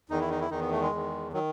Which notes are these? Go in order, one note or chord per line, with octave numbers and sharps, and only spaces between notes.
E2 D#3 D#4
E4
D#4
E4
E2 D#3 D#4
B3
A3
G#3
E2 D#3
D#3 F#3